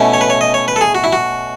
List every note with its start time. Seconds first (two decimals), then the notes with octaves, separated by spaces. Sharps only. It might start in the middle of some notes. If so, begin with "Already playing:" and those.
Already playing: B2 A3 C#4 E4
0.14 C#5
0.21 B4
0.30 C#5
0.41 D#5
0.54 C#5
0.68 B4
0.76 A4
0.81 G#4
0.95 F#4
1.04 E4
1.13 F#4